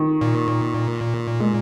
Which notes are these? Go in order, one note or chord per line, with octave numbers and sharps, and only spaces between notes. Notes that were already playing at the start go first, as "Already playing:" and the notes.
Already playing: D#3
A#2
G#3